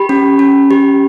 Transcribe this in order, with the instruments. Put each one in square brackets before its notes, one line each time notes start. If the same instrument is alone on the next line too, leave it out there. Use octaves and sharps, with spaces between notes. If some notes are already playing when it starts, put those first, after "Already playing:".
Already playing: [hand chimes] G4 B5
C#4
C#4
G4